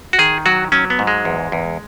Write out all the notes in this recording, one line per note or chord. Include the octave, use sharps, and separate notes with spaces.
F#4
D#3 G#4
F#3 F#4
F#3 C#4
B3
G#2
G#3
E2
E2